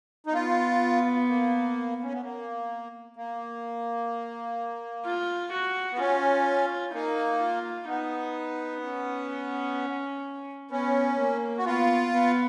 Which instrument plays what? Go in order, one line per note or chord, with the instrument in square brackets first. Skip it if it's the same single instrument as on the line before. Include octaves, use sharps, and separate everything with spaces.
[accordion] D#4
[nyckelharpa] B3 [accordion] F4
[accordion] A#3
C#4
B3
A#3
A#3
[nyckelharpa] F4
F#4
[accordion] B3
[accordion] C#4 [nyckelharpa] F4
[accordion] A#3 [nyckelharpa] D#4
[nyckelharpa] F4
[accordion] B3 [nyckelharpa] D#4
[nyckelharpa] C#4
[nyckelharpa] B3 [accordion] C#4
[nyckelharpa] A#3
[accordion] F#4
[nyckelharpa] B3 [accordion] F4
[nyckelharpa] B3